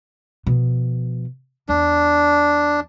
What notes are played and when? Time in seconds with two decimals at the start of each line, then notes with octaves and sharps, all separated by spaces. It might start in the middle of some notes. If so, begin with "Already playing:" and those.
0.46 B2 F3
1.69 E2 D4